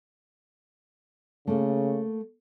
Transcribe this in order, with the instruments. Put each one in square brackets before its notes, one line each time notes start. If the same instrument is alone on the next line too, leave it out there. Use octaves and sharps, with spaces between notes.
[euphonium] C#3 [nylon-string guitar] A3 A#3